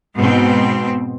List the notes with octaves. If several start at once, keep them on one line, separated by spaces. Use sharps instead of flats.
G#2 B2 C4